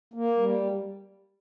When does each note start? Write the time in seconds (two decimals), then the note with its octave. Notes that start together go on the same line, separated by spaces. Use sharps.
0.14 A#3
0.37 G3